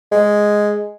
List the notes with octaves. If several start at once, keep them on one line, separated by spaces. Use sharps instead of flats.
G#3